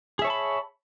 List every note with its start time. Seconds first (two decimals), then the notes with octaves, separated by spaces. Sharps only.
0.19 G#4
0.22 E5
0.25 C#5
0.27 A5
0.30 B5